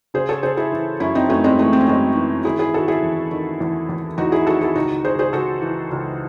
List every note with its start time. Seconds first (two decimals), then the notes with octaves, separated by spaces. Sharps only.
0.14 C#3 G#4 C5
0.29 A4 C#5
0.43 C#3 G#4 C5
0.57 E4 G#4
0.72 E3
1.00 F#2 C#4 E4
1.15 C4 D#4
1.29 F#2 A3 C#4
1.44 G#3 C4
1.58 E3 A3
1.73 C4
1.81 C#4
1.88 F#2 G#3 C4
2.16 E3
2.45 D#3 E4 G#4
2.59 E4 G#4
2.74 D#3 F#4 A4
2.88 E4 G#4
3.03 E2
3.31 D#3
3.60 E2
3.89 E2
4.18 E2 D#4 F#4
4.32 E4 G#4
4.46 D#3 F#4 A4
4.61 E4 G#4
4.75 C#2 D#4 F#4
5.05 C#2 G#4 C5
5.19 G#4 C5
5.33 C#2 F#4 A4
5.62 E3
5.91 C#2